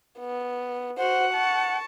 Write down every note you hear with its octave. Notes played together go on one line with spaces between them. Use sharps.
B3
F#4 C5 F#5
A5 C#6